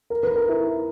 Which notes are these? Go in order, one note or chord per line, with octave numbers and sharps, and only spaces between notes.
A#4
B4
A#4
E4